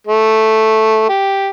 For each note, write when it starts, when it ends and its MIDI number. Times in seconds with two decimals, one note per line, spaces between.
0.07 1.06 57
1.09 1.50 67